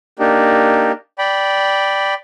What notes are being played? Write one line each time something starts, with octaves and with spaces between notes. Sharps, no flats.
A#3 D4 D#4 G4
D5 G5 B5